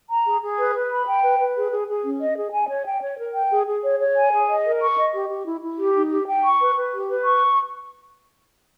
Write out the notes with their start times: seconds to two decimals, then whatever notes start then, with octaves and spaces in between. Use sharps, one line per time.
0.09 A#5
0.25 G#4
0.42 G#4
0.58 B4
0.74 B4
0.90 B5
1.06 G5
1.23 B4
1.39 B4
1.56 G#4
1.72 G#4
1.88 G#4
2.04 C#4
2.20 D#5
2.37 G#4
2.53 G#5
2.69 C#5
2.86 G5
3.02 C#5
3.18 A#4
3.34 G5
3.51 G#4
3.67 G#4
3.83 C#5
4.00 C#5
4.16 G#5
4.32 G#4
4.49 D#5
4.64 A#4
4.81 C#6
4.97 D#5
5.14 G4
5.30 G4
5.46 E4
5.62 E4
5.78 G4
5.95 D#4
6.11 G4
6.27 G5
6.43 C#6
6.60 B4
6.76 B4
6.93 G4
7.08 B4
7.25 C#6